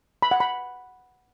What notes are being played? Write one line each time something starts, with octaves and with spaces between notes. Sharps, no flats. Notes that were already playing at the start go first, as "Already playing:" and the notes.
B5
F#5
B5